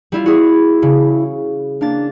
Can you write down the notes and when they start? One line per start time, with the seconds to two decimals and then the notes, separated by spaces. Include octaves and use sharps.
0.12 G3 E4 F4
0.26 E4 F#4 G#4
0.82 C#3
1.81 A#3 D4 A6